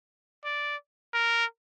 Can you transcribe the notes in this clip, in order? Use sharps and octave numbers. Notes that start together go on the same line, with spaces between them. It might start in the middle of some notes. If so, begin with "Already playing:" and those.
D5
A#4